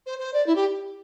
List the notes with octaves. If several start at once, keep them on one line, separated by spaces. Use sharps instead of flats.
C5
C5
D5
E4
G4